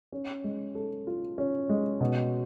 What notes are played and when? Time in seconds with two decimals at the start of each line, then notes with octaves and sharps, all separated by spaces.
0.12 C#4
0.44 G#3
0.75 A4
1.07 F4
1.38 C#4
1.69 G#3
2.01 B2